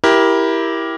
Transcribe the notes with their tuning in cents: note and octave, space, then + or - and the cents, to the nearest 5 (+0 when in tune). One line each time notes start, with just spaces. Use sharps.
E4 +0 G4 +0 A#4 +15